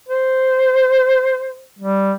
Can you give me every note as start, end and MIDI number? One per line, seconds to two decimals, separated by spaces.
0.09 1.63 72
1.79 2.12 55